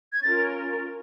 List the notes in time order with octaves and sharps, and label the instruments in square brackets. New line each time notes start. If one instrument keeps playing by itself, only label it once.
[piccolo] G#6
[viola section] C#4 F4 A#4 [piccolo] A6